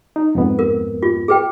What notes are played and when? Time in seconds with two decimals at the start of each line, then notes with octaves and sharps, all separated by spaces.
0.16 D#4
0.35 F2 G#2 B3
0.59 A#4
1.03 F4
1.28 G#4 B4 G5